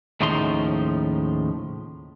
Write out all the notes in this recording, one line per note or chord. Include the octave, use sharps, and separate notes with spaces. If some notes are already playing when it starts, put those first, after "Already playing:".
D#2 A2 C#3 F3 D#4 C6